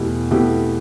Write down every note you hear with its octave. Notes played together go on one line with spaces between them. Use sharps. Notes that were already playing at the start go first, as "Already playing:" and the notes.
Already playing: E2 B2 A3 E4 G4
B2 A3 E4 G4